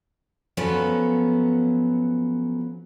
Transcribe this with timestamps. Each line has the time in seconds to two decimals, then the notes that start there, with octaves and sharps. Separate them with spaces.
0.57 F3 F#3 B3 C#4 A4 B4